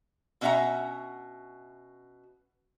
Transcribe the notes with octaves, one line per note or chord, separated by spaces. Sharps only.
B2 C#4 D4 E5 F#5 A#5